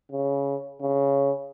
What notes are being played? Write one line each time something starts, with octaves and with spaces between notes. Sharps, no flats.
C#3
C#3